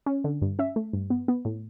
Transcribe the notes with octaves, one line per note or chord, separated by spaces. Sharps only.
C#4
D3
G2
C#4 E5
A3
G2
B3
B3
A2